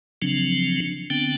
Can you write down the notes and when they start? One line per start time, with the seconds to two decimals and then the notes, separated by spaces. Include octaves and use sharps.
0.22 C#3 F3 F#3 C4 D4
1.10 D3 B3 C4 D4 G5